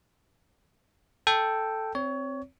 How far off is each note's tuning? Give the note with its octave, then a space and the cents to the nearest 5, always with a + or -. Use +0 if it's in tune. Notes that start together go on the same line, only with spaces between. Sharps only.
A4 +0 G5 +0
C4 +0 C#5 +25